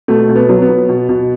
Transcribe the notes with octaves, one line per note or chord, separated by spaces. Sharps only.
B2 A3
B2
B3
F#3
B3
F#3
B2
B2